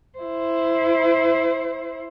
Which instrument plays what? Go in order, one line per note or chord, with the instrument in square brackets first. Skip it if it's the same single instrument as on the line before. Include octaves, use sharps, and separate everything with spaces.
[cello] E4 C5